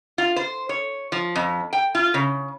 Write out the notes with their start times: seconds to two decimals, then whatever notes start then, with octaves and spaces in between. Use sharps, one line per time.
0.18 F4
0.36 C5
0.69 C#5
1.12 F3
1.36 F2
1.73 G5
1.95 F4
2.14 C#3